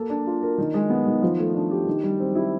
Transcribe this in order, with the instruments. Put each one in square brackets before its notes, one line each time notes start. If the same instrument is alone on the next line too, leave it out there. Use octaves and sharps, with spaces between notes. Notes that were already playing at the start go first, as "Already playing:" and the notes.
Already playing: [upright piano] A#3 A4
D4
F4
A#4
D#3
G#3
B3
D#3
F3
A3
D4
G4
D#3
G3
C4
E4